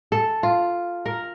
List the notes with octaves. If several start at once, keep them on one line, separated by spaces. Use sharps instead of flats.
A4
F4
A#4